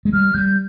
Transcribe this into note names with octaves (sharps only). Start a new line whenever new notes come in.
G#3
G3 F6
G3 G6